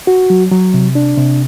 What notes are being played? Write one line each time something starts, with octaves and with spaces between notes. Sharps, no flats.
F#4
F#3
F#3
C3
D4
C3